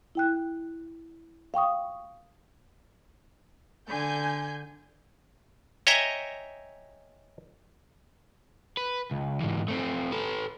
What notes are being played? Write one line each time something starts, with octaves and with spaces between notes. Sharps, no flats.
E4 G5 F#6
F5 G5 C#6 D#6
D3 G#5 G6
C#5 D#5 E5 G5 G#5 A#5
B4
C#2
G#2 E3
A3 C4
A4 B4